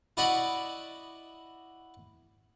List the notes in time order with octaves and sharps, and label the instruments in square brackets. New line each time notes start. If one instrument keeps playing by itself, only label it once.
[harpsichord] E4 F#4 D5 D#5 F#5 B5